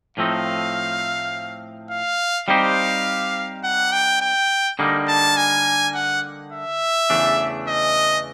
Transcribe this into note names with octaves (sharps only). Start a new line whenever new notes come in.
A2 F3 A3 C4 D#4 F5
F5
G3 C4 D#4 G4 C5 F5
F#5
G5
G5
D3 G3 A#3 D#4
A5
G#5
F#5
E5
E2 C#3 E3 A3 D4
D#5